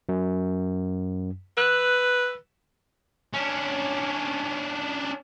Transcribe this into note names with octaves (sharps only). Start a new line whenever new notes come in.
F#2
B4 E6 F#6
C#4 D4